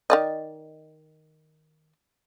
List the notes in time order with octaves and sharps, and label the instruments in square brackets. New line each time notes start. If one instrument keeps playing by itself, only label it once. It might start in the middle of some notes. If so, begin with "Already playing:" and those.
[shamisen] D#3 D5 D#5